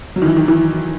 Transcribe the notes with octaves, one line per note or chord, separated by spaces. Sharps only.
F#3
D#3
E3
D#3
E3